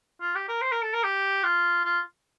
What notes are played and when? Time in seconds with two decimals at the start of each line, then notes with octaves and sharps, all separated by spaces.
0.22 F4
0.35 G4
0.49 A#4
0.62 C5
0.72 A#4
0.82 A4
0.94 A#4
1.04 G4
1.44 F4
1.85 F4